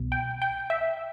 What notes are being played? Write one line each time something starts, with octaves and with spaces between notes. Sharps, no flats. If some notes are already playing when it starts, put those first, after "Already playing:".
Already playing: C2 B2
G5
G5
E5